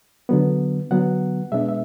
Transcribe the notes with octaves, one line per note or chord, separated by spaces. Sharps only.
D3 F#3 B3
D3 F#3 B3 F#5
B2 G#3 B3 D4 E5
E5